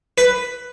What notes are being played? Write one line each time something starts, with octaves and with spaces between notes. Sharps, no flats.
B4